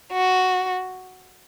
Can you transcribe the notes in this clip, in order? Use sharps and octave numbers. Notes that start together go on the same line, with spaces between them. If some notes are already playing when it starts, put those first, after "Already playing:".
F#4